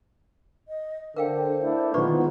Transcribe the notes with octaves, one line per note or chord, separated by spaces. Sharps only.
D#5
D3 A#4 C5 F5 G5
A3 D4 E4
D#3 G#3 B3 F4 B4 D5 C#6